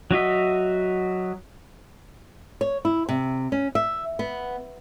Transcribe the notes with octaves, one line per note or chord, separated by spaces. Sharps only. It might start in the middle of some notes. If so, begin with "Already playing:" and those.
F#3 F#4 D#5 E5
C#5
E4
C3
C#4
E5
B3